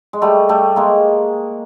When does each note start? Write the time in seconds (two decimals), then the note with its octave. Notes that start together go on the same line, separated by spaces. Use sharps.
0.13 G#3
0.22 G3 A3
0.49 G3 A3
0.76 G#3 A#3